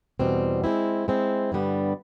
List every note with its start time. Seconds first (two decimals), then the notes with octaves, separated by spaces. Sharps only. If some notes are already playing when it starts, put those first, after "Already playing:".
0.20 E2 B2 G3 C4
0.64 G#3 C4 E4
1.08 G#3 C4 E4
1.52 G2 D3 G3 B3